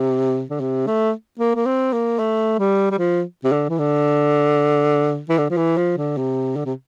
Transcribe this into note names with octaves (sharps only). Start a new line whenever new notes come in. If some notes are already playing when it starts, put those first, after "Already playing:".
Already playing: C3
D3
C3
A3
A#3
A#3
C4
A#3
A3
G3
G3
F3
C3
D3
E3
D3
E3
D3
F3
E3
F3
D3
C3
D3
C3